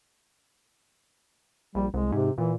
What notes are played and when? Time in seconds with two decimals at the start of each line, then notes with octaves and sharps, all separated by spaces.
1.75 A#1 G3
1.94 C2 G#3
2.12 G#2 C3
2.38 A#2 E3